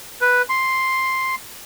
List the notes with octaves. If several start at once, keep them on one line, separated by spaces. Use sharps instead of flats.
B4
C6